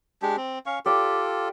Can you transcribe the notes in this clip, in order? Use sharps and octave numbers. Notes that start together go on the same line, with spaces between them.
G#3 D4 G4
C4
C#4 F5 C#6
F4 G4 A4 D5